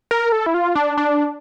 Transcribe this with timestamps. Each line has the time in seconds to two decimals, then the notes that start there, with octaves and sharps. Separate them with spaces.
0.11 A#4
0.32 A4
0.46 E4
0.54 F4
0.75 D4
0.97 D4